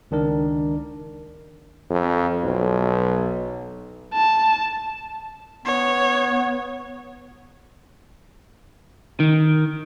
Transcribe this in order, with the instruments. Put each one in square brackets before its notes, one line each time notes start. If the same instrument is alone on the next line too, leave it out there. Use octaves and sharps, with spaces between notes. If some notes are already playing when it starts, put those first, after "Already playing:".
[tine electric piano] C#2 D#3 D4 A#4
[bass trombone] F2
B1
[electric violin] A5
[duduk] B3 [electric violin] C#5
[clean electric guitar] D#3